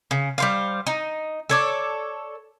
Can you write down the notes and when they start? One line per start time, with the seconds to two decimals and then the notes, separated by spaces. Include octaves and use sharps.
0.11 C#3
0.38 G3 C5 F5
0.87 D#4
1.50 A4 C#5 D5